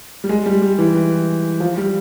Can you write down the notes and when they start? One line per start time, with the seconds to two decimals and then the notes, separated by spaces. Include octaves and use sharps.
0.24 G3
0.29 G#3
0.46 G3
0.62 G3
0.79 E3
0.94 E3
1.60 F3
1.77 G3